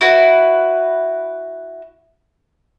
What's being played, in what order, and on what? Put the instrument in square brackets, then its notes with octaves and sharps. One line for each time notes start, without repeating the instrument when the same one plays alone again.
[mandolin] E4 F#4 B4